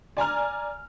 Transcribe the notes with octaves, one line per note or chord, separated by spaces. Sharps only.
D5 G#5 A#5 F6